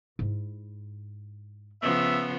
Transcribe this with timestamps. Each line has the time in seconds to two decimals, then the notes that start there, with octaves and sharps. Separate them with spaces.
0.19 G#2 E4
1.82 C#3 F3 B3 E5